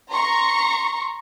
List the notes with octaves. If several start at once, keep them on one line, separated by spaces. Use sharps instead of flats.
A#5 C6 C#6